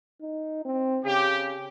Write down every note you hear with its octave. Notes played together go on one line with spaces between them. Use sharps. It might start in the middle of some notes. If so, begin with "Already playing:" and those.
D#4
C4
C#3 G4